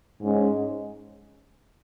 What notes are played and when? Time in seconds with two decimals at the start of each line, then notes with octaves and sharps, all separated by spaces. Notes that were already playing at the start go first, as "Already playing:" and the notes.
0.21 G#2 G#3 C#4